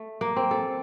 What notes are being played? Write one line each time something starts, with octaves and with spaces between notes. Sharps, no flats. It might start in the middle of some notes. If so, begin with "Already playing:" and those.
Already playing: A3
A#3
C4
A4